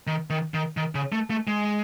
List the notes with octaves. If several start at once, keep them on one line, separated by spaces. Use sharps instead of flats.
D#3
D#3
D#3
D#3
C#3
A3
A3
G#3